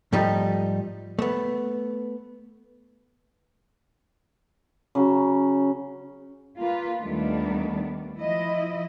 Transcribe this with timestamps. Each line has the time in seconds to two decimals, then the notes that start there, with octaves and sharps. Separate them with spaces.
0.12 G#2 F3 G3 A3 D#4
1.19 A3 B3
4.95 C#3 F#3
6.58 A#3 F4 B4
7.01 D#2 D#3 G3 A3 B3 D4
8.18 F3 E4 D#5